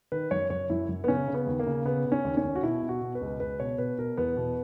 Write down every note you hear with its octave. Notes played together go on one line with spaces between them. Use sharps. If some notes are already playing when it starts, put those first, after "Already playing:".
D#3 B4
F#2 C#5
F#2 C#5
F#2 E4
F#2
B3
C#3 C#4
C#3
B3
D#2
A#3
C#3
C#3 B3
C#3
C#4
D#2
C#4
D#2
F#4
B2 E4
B2
F#4
B2
B4
C#2
C#2 B4
B2 C#5
B2 B4
B2 A#4
E2 B3
B2